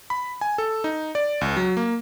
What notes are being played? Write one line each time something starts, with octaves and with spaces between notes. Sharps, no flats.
B5
G#5
A4
D#4
D5
C#2
F#3
A#3